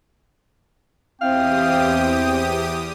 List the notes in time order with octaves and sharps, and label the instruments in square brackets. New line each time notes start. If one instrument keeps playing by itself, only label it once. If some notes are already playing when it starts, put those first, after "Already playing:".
[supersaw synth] E2 G4 D#6 [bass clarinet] C4 [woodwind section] E4 C5 G5 [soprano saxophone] F5